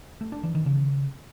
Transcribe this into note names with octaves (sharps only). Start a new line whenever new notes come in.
A3
D4
E3
D#3
C#3